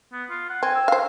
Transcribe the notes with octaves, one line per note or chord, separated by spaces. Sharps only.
B3
F4
F#5
C4 G#5
E6
C5 F5